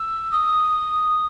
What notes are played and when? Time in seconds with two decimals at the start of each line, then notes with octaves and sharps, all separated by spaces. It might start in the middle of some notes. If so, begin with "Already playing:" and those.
Already playing: E6
0.32 D#6